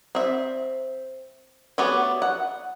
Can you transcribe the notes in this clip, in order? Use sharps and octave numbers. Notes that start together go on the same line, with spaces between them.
C4 E5
A3 B3 F#4 G4 C#5
F#5